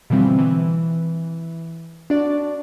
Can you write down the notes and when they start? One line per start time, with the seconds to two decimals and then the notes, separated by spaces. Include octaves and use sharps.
0.10 B2 D3 E3 F3 G3 C4
0.39 E3
2.10 D4 F#4 D5